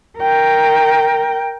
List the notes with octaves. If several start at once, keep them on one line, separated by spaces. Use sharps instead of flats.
A#4 G5